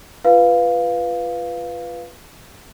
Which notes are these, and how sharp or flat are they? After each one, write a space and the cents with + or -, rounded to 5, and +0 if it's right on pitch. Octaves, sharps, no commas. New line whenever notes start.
F4 -15 B4 +0 F5 +0